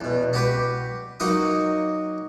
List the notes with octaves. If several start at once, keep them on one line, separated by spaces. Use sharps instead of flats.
E2 B2
F#4 G4 B4 G5
F#3 A#3 D#4 F#4 F#5 D#6